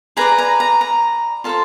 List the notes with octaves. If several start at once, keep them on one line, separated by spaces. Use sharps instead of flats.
G#4 B4 D5 A#5
A#5
A#5
A#5
F4 A4 C5 A5